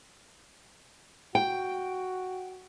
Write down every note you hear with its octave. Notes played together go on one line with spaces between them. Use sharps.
F#4 G5